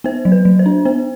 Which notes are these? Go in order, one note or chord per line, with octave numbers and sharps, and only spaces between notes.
B3 C5
F#3
B4
F#3
C5
D4
B3 C5